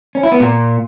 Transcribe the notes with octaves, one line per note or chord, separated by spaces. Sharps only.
C#4
E4
B3
A#2